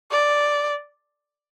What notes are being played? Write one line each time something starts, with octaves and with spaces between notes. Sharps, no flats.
D5